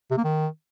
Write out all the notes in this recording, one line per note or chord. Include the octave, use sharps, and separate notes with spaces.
C3
A#3
D#3